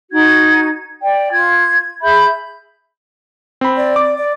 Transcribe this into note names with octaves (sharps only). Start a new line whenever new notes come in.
D#4 F#4 G#6
D5 G5
F4 G#6
G#4 E5 B5 G6
C4 B5
D5
D6
D5